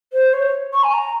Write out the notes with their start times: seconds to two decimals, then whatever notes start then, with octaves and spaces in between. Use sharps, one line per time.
0.13 C5
0.33 C#5
0.74 C#6
0.84 G#5
0.94 A#5